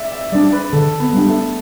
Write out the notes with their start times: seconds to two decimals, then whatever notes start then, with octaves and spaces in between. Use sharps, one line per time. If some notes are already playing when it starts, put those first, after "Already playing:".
Already playing: D5 E5
0.11 E5
0.32 G3 D4 D5
0.52 B4
0.72 D3 A4
1.00 B3
1.13 G3 D4
1.26 A3